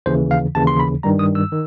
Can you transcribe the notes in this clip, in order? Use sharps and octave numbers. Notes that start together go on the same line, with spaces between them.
D#2 C#3 E3 C5
F5
D#2 C#3 E3 A5
C6
B5
G2 D#3 G3 A#5
D#6
E6
D#3